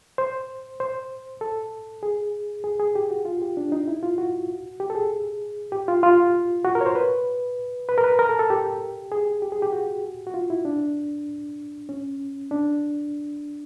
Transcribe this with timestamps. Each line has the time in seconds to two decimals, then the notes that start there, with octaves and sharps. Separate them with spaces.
0.18 C5
0.80 C5
1.41 A4
2.03 G#4
2.64 G#4
2.79 G#4
2.95 G4
3.11 F#4
3.25 F4
3.42 G4
3.57 D4
3.72 D#4
3.88 E4
4.03 F4
4.18 F#4
4.80 G4
4.90 A4
4.95 G#4
5.72 G4
5.88 F4
6.03 F4
6.65 F#4
6.75 A#4
6.81 C#5
6.86 C5
6.95 B4
7.89 B4
7.98 A#4
8.04 B4
8.19 A#4
8.29 A4
8.39 A4
8.50 G4
9.12 G#4
9.42 G4
9.52 G#4
9.62 G4
9.72 F#4
10.27 F#4
10.34 F4
10.50 E4
10.65 D4
11.89 C#4
12.51 D4